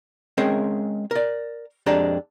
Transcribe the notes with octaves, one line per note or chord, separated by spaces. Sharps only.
G#3 C4 C#4 G#4 A#4 G5
A#4 D5
F2 G#3 D4 G4 A4 A#5